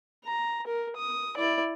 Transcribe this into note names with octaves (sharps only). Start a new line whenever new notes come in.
A#5
A#4
D#6
E4 D5